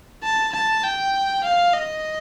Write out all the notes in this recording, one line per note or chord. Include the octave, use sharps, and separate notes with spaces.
A5
A5
G5
F5
D#5